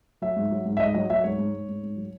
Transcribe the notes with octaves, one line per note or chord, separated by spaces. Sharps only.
F#3 E5
G#2
F#3
G#2
E5
G#2 D#5
F#3 D#5
F#3 E5
G#2 C#5
G#2
G#2
G#2
G#2
F#3